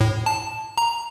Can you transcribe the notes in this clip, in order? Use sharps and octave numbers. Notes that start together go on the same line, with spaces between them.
A2
A5
A#5